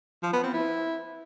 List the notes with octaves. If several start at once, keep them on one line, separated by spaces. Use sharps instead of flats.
F3
B3
C4
E4